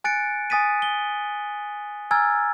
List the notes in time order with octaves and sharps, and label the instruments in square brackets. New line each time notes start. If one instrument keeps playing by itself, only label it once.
[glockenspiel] G#5 F#6 A6 C#7 D7
G#5 D#6 A6 B6 D#7
G7
G#5 A#5 E6 F6 G#6 A6